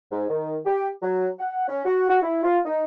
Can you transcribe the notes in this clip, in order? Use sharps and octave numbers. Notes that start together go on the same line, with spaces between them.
G#2
D#3
G4
F#3
F#5
C#4
F#4
F#4
E4
F4
D#4